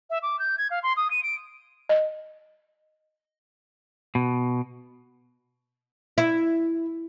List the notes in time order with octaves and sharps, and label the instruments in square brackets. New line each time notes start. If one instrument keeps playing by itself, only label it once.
[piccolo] E5
D6
G6
G#6
F5
C6
D#6
D#7
D7
[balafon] D#5
[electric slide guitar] B2
[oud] E4